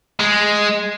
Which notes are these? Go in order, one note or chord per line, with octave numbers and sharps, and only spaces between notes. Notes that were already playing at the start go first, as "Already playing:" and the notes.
G#3